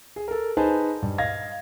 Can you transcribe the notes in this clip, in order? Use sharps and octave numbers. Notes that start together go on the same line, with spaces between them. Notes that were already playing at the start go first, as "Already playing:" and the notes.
G#4
A4 A#4
D#4 G#4 B4 C5 G#5 A5
G2
D#5 F5 G#6 A#6